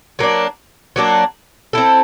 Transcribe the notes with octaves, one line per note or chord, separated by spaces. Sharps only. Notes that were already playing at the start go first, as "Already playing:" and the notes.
F#3 A#3 D4
F#3 A#3 D4
C4 E4 A4